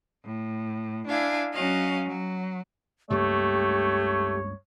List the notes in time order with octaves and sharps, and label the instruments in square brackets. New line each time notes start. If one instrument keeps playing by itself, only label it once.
[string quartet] A2
D4 E4 F5 G#5
F#3 C#4 F#4 D#5 F5
F#3
[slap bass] C#2 G2 A#3 [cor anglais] A3 [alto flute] G4 [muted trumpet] C#5